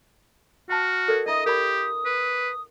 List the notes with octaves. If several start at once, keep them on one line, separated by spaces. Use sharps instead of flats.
F#4 G5 A5 F6
A4 A#4 D5
D4 E4 D#5 E5 D#6
G4 A#4 D5 B5
B4